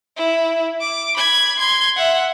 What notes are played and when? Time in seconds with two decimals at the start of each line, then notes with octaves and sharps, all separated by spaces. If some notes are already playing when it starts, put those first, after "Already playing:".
0.17 E4
0.80 D6
1.17 B5 G#6
1.59 C6 G#6
1.96 E5 F#5